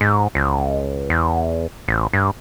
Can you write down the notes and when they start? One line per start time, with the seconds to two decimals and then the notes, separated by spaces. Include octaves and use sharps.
0.01 G#2
0.35 C#2
1.10 E2
1.88 A1
2.13 G2